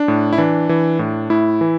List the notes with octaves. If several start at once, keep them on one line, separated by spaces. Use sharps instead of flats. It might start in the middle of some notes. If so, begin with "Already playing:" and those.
Already playing: D4
A2
E4
E3 D4
E3
A2
A2 E4
E3